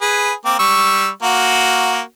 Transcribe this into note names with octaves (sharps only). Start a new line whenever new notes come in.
G#4 B4
A#3 C4 D6
G3 C#6 E6
A#3 F#4